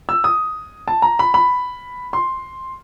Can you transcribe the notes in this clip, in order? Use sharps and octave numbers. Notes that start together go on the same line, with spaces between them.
E6
D#6
A5
A#5
B5
B5
C6